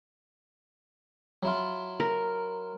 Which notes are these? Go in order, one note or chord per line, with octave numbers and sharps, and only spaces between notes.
F#3 E4 F4
A#4